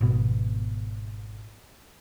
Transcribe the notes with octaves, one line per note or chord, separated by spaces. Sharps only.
G#1 B2 B3